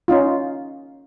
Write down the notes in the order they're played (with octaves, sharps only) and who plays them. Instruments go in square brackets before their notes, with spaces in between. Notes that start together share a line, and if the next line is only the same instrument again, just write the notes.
[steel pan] C#4 D#4 F4